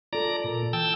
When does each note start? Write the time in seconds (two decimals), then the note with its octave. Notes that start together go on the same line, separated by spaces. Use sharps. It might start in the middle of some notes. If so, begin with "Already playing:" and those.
0.13 F4 A4 D5 A#5
0.44 A#2
0.73 E3 G5 A5 E6